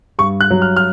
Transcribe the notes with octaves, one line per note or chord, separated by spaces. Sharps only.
G2 C#6
F#6
F#3
F6
F6